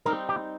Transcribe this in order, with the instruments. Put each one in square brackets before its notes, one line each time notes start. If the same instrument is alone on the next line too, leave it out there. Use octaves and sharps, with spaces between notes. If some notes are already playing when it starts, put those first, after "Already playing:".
[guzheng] G3 C4 D#4 [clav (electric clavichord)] A#4
[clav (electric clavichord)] G4